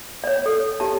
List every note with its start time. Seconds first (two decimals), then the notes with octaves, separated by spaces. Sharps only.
0.24 C#5 D5
0.46 A4
0.80 G4 A5